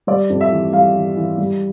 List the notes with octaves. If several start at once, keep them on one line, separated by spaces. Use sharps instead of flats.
G3 D5
F2
E5
E3
G3 F5
E3
E3
G3